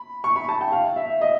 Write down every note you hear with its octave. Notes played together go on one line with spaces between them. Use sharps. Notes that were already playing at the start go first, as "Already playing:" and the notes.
Already playing: B5
C#6
B5
A5
G5
F5
E5
D#5